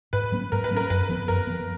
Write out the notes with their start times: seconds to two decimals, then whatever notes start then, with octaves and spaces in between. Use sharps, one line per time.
0.13 G#2 B4
0.32 F#3 A#3 C#4
0.52 G#2 A#4
0.64 B4
0.71 F#3 A#3
0.75 C#4 A#4
0.90 F#2 B4
1.09 F3 B3
1.28 F#2 A#4
1.47 F3 B3